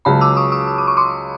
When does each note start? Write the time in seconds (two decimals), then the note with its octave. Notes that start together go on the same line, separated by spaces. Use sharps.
0.05 C#2 C#3 F#3 A5 B5
0.21 D6 E6
0.37 C#6 D#6
0.52 C#6 D#6
0.67 D#6
0.78 D6
0.88 C#6
0.97 C6 D6